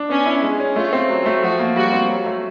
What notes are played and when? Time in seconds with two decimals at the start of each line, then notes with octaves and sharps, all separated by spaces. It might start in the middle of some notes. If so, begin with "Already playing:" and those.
Already playing: D4
0.09 B3 C#4
0.26 E4
0.42 G#3
0.60 C#4
0.75 A3 F4
0.93 C4
1.10 F#3
1.26 A3
1.43 F3 F#4
1.59 A#3
1.76 G3 F#4
1.93 C4
2.09 F#3
2.26 A3